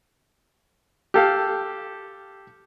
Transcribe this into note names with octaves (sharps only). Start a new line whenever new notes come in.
G4 A4 F5